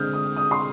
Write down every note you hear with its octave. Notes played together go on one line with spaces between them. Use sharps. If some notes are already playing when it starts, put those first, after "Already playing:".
Already playing: D3 G#3 C4 D#6 F6 G6
D#6
D#6
C6